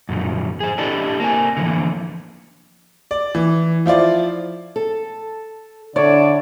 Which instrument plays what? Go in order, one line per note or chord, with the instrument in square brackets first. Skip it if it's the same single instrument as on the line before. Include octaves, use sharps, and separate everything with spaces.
[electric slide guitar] F#2 A#2 D3 F3
G#4 C5
D4 E4 G4 A4 D5 D#5
A#3 C4 G#5
D3 E3 F3 A#3
[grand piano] D5
E3
F3 E4 F4 D5
[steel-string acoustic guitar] A4
[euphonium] D3 [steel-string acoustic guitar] D4 E4 [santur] C#5 [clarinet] D5